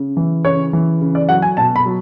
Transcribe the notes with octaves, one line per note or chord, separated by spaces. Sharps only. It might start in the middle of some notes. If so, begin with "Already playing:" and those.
Already playing: C#3
E3
C#3 C#5
E3
C#3
D5
F#3 F#5
G#5
B2 A5
B5
F#3